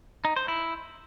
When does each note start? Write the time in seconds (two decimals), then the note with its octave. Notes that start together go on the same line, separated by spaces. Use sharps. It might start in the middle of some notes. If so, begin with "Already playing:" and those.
0.25 D#4
0.36 C5
0.48 E4